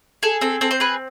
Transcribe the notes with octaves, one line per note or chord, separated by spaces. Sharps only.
G#4 A4
C4 A4
C4 A4
C5
G#4 B4